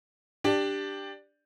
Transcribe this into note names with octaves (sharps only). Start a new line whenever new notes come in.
D4 G4 D5